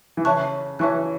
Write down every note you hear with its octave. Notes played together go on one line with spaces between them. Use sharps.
E3
C#3 C#5 E5 A5 C#6 F#6
E3 C#5 E5 A5 C#6 F#6